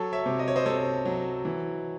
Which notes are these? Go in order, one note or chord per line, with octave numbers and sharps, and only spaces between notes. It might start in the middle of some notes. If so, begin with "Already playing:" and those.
Already playing: F#3 A4 C#5
C#5 E5
C3
D#5
C#5
C5 D#5
C3 A4 C#5
F#3
E3